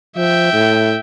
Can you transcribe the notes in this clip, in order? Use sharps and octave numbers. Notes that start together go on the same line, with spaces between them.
F3 E5 G5
A2